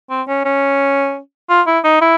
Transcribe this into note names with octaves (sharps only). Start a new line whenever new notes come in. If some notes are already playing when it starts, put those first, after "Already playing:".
C4
C#4
C#4
F4
E4
D#4
E4